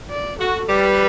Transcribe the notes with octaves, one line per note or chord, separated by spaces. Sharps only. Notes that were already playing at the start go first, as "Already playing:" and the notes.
D5
F#4 A4
G3 B4